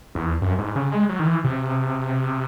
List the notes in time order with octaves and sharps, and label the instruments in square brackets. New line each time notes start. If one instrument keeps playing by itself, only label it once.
[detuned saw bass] E2
F#2
G#2
C#3
G#3
F#3
D#3
E3
C3